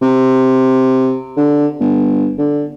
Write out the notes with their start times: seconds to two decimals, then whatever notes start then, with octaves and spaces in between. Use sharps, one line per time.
0.02 C3
1.37 D3
1.80 G1
2.38 D3